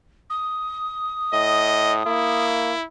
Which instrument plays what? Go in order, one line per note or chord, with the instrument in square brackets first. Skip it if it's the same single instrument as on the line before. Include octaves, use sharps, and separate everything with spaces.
[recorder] D#6
[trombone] A2 [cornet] D#5
[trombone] A#3 [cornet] E4